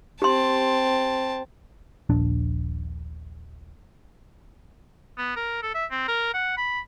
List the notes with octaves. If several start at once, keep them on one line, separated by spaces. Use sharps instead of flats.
C4 G4 A5 C6
D#1 A#1 D4
B3
A#4
A4
E5
C4
A#4
F#5
B5